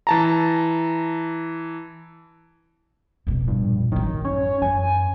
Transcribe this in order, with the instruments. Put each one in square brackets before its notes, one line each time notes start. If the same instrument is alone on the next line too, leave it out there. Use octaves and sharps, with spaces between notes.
[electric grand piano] E3 A5 A#5
[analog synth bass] D#1 [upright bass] F2 B2
[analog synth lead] G2 [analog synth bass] A#2
[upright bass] A1 F#2 [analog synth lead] D#3 [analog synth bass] F#3
[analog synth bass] C#4 [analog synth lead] C#5
[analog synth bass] F#2 [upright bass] E3 [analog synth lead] G#5